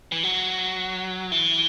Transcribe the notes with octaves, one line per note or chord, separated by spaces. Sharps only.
E3
F#3
E3